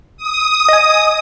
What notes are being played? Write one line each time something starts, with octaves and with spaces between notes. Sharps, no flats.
D#6
D#5 G#5